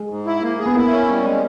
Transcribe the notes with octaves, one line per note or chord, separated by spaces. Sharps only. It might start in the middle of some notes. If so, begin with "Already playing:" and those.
Already playing: G#3
G#2
E4
A#3
G#4
B3
A#3 E4
C#4
G3
G#3